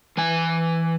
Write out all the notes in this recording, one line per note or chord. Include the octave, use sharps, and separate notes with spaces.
E3 G#5